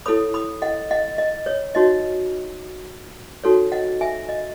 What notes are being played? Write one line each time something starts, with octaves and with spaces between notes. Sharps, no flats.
E4 A4 C#5 B5 D#6
B5 D#6
D#5 F#5
D#5 F#5
D#5
C#5
D#4 F#4 C#5 D#5
D#4 F#4 A4 C#5
D#5 F#5
E5 G#5
D#5